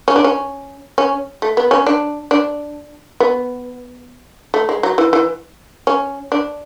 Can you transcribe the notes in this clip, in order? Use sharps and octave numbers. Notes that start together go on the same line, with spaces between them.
C#4
D4
C#4
C#4
A3
B3
C#4
D4
D4
B3
A3
G#3
F#3
E3
E3
C#4
D4